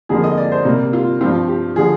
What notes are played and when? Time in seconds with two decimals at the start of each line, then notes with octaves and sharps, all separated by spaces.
0.09 F2 D3 F3 A#3 G#4
0.24 D#5
0.38 D5
0.52 C5
0.65 C3 G3 A#3
0.93 F4
1.21 G2 F3 C4 F4
1.48 G4
1.76 D3 F3 G#4